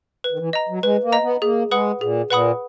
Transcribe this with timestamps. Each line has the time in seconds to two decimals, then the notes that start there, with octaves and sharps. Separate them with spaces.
0.24 B4
0.31 D#3
0.39 E3
0.53 D#5 A#5
0.69 F#3
0.83 G#3 B4
1.03 A#3
1.12 D#5 A#5
1.23 B3
1.42 A#3 G#4
1.71 G#3 B4 F#5 B5 D#6
2.01 A#2 G#4
2.30 A#2 B4 F#5 B5 D#6